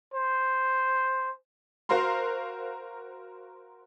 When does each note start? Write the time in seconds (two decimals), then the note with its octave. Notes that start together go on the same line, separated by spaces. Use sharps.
0.14 C5
1.89 F#4 A#4 C5 F5 A#5 C6